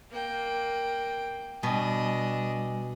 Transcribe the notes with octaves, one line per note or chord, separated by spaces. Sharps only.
A#3 G5
B2 G3 D4 D#5 G#5